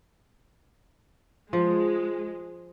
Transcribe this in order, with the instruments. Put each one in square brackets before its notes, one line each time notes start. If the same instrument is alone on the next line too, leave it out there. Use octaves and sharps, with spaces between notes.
[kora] F3 [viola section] G#3